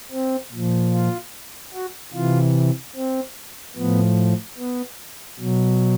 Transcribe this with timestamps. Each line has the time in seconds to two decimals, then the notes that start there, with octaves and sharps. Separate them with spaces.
0.11 C4
0.52 A#2 F3
0.93 F4
1.73 F#4
2.14 C3 E3 F4
2.95 C4
3.76 A2 F3 B3
4.58 B3
5.39 B2 F#3